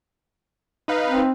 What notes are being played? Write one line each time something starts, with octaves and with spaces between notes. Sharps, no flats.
D#4 B4 F5
C4